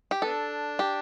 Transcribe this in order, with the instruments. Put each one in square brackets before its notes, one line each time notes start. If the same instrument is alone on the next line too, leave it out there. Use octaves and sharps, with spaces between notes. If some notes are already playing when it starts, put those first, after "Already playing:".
[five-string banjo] G4
[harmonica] B3 D4 [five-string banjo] A4
[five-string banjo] G4